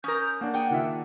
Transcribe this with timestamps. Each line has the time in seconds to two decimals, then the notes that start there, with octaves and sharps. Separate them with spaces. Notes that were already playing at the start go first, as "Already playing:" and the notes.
0.04 C#4 A#4 D#6 G6
0.41 A#3 D4 F#5
0.54 G#4 G5
0.70 D#3 F4 E5